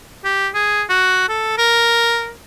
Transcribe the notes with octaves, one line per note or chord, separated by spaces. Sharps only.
G4
G#4
F#4
A4
A#4